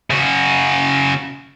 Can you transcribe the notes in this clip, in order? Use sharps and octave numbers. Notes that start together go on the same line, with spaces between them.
C#3 F#4